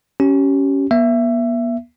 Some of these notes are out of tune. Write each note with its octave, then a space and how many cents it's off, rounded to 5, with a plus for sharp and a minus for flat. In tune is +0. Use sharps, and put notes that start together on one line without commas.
C#4 +0 G4 -30
B3 -45 E5 +20